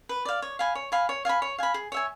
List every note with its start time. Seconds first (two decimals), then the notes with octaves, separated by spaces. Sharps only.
0.09 B4
0.25 D5 F5
0.42 C#5
0.59 F5 G#5 B5
0.75 C#5
0.92 F5 G#5 B5
1.09 C#5
1.25 F5 G#5 B5
1.42 C#5
1.58 F5 G#5 B5
1.74 G#4
1.92 C#5 E5 G#5